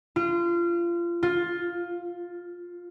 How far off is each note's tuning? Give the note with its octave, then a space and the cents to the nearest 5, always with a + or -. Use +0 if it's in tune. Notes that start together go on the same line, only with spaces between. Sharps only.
F4 -25
F4 +10